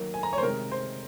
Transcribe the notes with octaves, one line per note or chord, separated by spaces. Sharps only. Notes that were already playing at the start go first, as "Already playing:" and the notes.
Already playing: D#3 F#3 A#3
G#5
A#5
C#5
C5
C3 D#3 G#3 A#4
C5